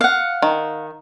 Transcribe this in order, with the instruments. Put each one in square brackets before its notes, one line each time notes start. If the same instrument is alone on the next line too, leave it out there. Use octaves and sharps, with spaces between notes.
[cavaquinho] F5 F#5
[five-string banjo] D#3